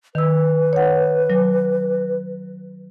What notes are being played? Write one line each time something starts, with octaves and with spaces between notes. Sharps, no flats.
D#3 B4 E6
C#5 F#5
F#3